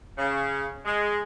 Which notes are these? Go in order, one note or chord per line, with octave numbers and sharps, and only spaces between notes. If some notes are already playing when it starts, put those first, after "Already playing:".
C#3
G#3